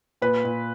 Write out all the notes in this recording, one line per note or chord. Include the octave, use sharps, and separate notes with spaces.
A#2 B4
A#2